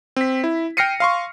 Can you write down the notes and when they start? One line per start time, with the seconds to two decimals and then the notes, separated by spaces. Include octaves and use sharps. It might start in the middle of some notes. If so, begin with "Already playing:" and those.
0.16 C4 B6
0.44 E4
0.77 G5 F6 A#6 C7 C#7 D#7
1.00 F5 C6 C#6